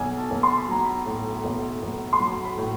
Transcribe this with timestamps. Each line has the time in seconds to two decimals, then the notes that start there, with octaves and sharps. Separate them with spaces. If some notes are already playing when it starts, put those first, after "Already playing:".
Already playing: B1 G#5
0.18 A5
0.31 B1
0.43 C6
0.57 B5
0.68 F#3 A#5
0.85 B5
1.06 A2
1.44 B1
1.82 B1
2.13 C6
2.19 F#3 B5
2.45 B5
2.57 A2